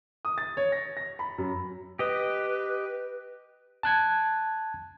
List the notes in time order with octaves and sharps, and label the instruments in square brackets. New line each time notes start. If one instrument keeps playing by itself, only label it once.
[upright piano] D#6
A6
C#5
A#6
A#6
B5
F#2
[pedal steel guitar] G4 D#5 [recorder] B4
[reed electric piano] A5 F#6 G#6